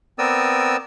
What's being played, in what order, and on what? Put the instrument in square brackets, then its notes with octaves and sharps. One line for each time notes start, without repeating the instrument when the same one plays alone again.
[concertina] B3 C4 A#4 D5 D#6 E6